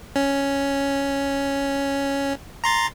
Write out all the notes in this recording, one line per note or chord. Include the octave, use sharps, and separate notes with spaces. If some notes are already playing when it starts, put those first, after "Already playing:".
C#4
A#5 C6 A6